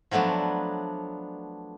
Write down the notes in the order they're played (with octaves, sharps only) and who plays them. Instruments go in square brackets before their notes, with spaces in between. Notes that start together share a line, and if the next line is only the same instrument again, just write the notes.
[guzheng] F3 F#3 A3 B3 D4